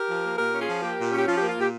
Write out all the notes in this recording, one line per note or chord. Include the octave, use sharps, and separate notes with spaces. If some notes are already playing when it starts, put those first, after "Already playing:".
Already playing: G4 A#4
F3
A#3
A#2 G4 A#4
C#4
F4 G#4
F3
A#3 G4
A#2
C#4
G4
F3 F4
A#3 G4
F4
A#2 G4